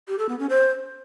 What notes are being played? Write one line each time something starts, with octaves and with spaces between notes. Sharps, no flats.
G4
A4
B3
C#4
C5